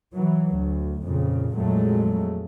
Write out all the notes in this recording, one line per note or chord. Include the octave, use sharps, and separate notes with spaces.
E3 F#3
D2
F2 A#2 C#3
F2 A#2 F#3 G#3 A3